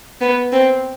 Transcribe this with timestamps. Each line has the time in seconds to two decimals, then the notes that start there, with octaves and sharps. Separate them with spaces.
0.21 B3
0.52 C4